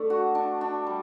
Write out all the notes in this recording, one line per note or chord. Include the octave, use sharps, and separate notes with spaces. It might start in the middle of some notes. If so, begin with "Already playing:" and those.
Already playing: A3 D4
F#4
D4
D4
G3